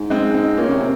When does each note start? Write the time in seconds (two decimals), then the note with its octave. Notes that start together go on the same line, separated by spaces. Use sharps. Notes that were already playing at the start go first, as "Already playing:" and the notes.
Already playing: G#2
0.10 G#3 C4
0.34 C4 D#4
0.57 A#2 A#3 C#4
0.68 C#3
0.74 C3
0.81 C4